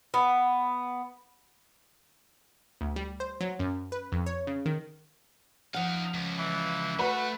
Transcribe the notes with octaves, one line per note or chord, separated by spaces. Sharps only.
B3
D2
G3
C5
F#3
F#2
B4
F2
C#5
C#3
D#3
F3 D#4 F5 F#5
C#2
E3
A3 F#4 B4